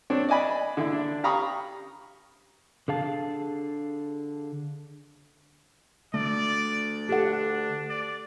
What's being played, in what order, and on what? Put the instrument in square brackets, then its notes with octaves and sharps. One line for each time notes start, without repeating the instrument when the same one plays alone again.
[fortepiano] C4 D4 C#5
D5 D#5 G#5 B5
D3 E4
D4
G4 F5 A#5 B5 C#6 D#6
[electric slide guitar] D3 G#4 F5 A5
[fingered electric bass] D3 A3 [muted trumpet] D5
[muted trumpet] D4 [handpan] G4 A4 F#5
[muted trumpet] D5